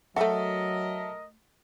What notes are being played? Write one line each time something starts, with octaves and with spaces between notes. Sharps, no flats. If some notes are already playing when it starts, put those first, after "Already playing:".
F#3 A3 F#4 A4 A#4 D#5 E5